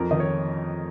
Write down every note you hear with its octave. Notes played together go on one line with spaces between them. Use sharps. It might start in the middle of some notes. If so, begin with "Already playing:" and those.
Already playing: F2 A#4
D#3 D#5
C#5